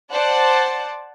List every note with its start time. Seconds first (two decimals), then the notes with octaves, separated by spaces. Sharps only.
0.12 C5 D5 F#5 A5